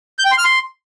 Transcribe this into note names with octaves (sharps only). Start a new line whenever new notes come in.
G6
G5
C6
F6
C6